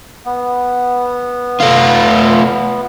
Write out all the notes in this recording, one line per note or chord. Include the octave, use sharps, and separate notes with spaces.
B3
A3 F4